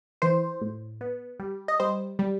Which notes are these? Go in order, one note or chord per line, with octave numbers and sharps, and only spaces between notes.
E3 C5
A2
B3
G3
D#5
G3 C5
G3